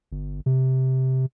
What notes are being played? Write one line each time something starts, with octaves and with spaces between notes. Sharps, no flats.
G1
C3